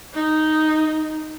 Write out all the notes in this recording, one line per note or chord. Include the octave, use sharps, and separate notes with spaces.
D#4